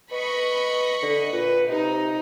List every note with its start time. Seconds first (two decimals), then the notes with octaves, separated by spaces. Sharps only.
0.11 B4 D#5 B5 C#6
1.02 D3
1.33 A#2 B4
1.69 C3 D#4